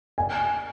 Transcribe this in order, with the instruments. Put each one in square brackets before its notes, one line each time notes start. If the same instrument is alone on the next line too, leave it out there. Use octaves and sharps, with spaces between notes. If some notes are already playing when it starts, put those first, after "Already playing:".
[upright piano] G#5